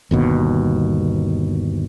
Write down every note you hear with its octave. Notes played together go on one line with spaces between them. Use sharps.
G1 D#2 B2